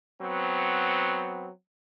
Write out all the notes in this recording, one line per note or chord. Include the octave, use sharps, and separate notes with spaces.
F#3 B3 C4